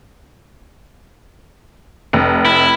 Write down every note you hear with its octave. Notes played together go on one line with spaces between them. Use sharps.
F1
E4